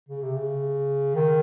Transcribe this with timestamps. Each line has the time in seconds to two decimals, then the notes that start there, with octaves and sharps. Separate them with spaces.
0.09 C#3
0.22 C3
0.34 C#3
1.15 D#3